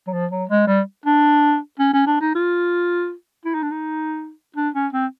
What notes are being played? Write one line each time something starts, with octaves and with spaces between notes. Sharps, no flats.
F#3
F3
F#3
G#3
G3
D4
C#4
C#4
D4
D#4
F4
E4
D#4
D4
D#4
D4
C#4
C4